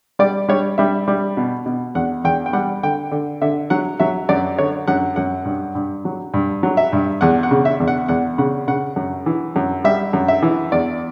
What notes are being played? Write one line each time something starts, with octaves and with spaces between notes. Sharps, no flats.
G3 D5
G3 C#5
G3 E5
G3
B2
B2
E2 F#5
E2 G5
G5
G3 F#5
D3 G5
D3
D3 E5
F#3 F#5
F#3 E5
F#2 D5
D3 C#5
F#2 F#5
F#2 F#5
G2
G2
F#3
G2
F#3
E5
G2
E2 F#5
F#5
C#3
E5
E2
F#5
E2 F#5
C#3 F#5
C#3 F#5
F#2
E3
F#2
G3 E5
F#2
E5
E3
E2 D5